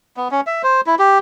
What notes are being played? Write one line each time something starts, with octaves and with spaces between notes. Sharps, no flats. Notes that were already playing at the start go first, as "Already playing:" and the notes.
B3
C#4
E5
C5
E4
G4